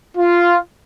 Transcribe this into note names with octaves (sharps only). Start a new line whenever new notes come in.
F4